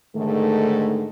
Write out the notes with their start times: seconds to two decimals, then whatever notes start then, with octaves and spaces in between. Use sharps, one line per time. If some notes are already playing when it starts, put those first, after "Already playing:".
0.16 G#2 D3 D#3 A3